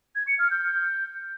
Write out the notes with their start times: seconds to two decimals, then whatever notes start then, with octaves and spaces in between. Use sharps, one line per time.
0.16 G#6
0.27 C#7
0.39 F6
0.51 G6